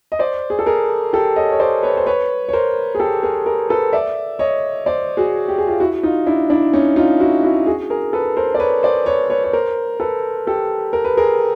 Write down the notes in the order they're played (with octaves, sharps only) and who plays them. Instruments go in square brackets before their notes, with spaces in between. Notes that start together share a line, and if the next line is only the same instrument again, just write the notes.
[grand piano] D#5
C5 D5
G#4
A4
G#4 A#4
G4 A4
C#5 D#5
C#5
C5 D5
B4 C#5
C5
B4 C#5
C#5
A#4 C5
G#4
G4 A4
G#4 A#4
G#4 A#4
A4 B4
D5 E5
C#5 D#5
C5 D5
F#4 G#4
G4
G#4
F4 G4
E4 F#4
D#4 F4
D4 E4
D4 E4
C#4 D#4
D#4 F4
E4 F#4
E4 F#4
F#4 G#4
G#4 A#4
A4 B4
A#4 C5
D5
B4 C#5
C5 D5
B4 C#5
B4 C#5
C#5
A#4 C5
A4 B4
G4 A4
A#4
B4
G#4 A#4